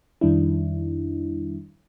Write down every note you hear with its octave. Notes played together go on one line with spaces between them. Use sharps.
F2 D#3 G3 D4 E4